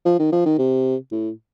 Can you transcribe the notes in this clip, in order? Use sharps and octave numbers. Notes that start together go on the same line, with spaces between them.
F3
D#3
F3
D#3
C3
A2